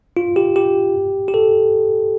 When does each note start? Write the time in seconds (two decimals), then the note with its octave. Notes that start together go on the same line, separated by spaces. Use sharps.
0.17 F4
0.36 G4
0.56 G4
1.28 G4
1.34 A4